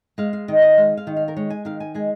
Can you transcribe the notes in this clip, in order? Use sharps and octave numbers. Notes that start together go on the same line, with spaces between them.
G#3 F5
F5
D#3 D#5
D#5
G#3 F5
F5
D#3
F5
A#4
G#3 C#5
G#5
D#3 F5
G#5
G#3 G#5